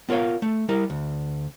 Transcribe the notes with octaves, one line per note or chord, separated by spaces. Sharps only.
B3 F4 A#4 C#5 F5
A3
G3 E4 A#4
D2